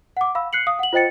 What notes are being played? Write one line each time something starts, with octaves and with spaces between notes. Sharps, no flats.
F#5 D6
F5 B5 E6
F#6 C7 C#7 F#7
F5 D#6
F#5 F#7
F4 C5 D#5 G5 A6 C#7